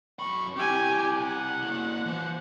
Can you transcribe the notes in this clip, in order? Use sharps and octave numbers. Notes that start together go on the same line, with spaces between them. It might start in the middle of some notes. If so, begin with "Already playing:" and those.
F#2 B5 C#6
C4 E4 G4 G#5
F#5
A#3 E4
E3 C5